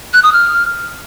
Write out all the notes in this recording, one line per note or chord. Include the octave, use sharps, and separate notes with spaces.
F#6
D#6
F6